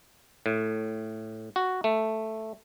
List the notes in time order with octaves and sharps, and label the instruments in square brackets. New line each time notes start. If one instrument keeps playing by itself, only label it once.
[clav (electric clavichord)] A2
F#4
A3